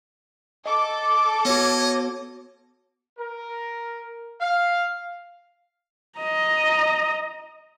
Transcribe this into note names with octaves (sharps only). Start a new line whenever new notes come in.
A4 D#5 D6
B3 F#4 C#5 D#5
A#4
F5
D#5 A#5